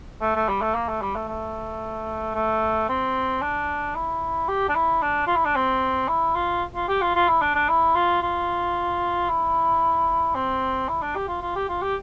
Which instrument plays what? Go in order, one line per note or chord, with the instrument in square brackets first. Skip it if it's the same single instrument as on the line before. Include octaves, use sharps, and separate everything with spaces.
[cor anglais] A3
A3
G3
A3
A#3
A3
G3
A3
A3
A3
C4
D4
E4
G4
D4
E4
D4
F4
E4
D4
C4
E4
F4
F4
G4
F4
F4
E4
D4
D4
E4
F4
F4
E4
C4
E4
D4
G4
F4
F4
G4
F4
G4